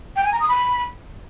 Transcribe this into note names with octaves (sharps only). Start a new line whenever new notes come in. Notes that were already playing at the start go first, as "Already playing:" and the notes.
G5
G#5
A#5
D#6
B5